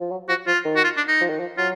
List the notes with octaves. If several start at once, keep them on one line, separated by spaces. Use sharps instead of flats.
F3
F#3
F3 F#4
F3 F4
D#3
F#4
F4
D4
D#4
F3
D#3
F3
F#3 F4